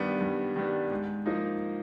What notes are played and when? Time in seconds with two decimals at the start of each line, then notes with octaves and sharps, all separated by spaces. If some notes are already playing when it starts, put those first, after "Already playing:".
Already playing: G2 D#3 G3 B3 D4
0.21 G2
0.56 D#3 G3 B3 D4
0.91 G#2
1.26 F3 A#3 D#4